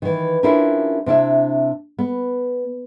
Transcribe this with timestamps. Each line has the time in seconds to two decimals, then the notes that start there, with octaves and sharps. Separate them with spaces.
0.02 D#3 E3
0.43 C#4 D4 E4 F4 G4 A#4
1.06 C3 D4 E4 E5
1.99 B3